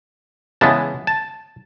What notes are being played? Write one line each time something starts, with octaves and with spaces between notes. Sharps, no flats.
C#3 E3 G#3 B3 A5
A5